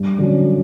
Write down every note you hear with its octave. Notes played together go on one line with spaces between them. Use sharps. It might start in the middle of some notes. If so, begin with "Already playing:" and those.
Already playing: G2
D3 F#3 C#4